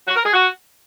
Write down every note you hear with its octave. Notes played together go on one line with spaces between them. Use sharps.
F#4
A#4
G#4
F#4